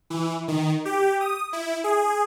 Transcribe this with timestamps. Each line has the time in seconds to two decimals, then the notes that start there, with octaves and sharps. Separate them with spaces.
0.10 E3
0.48 D#3
0.85 G4
1.21 D#6
1.53 E4
1.84 G#4